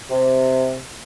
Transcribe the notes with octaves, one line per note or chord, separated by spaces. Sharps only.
C3